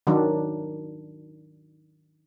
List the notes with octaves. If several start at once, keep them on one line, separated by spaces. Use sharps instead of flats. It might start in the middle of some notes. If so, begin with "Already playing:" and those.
D#3 F#3 D4